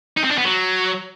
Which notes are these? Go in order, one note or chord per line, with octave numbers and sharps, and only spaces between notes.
D#4
C4
D4
B3
F#3